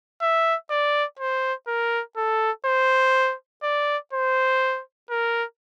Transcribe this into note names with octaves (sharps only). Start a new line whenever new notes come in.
E5
D5
C5
A#4
A4
C5
D5
C5
A#4